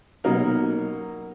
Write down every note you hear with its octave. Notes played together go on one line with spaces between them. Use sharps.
B2 F#3 A#3 D#4 A#4